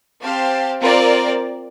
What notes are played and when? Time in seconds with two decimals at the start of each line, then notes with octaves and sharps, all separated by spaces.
0.22 C4 G4 C5 F5 A5
0.82 C4 F4 A#4 D5